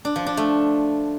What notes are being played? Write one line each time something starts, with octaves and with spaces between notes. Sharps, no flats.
D4
F3
D4
A3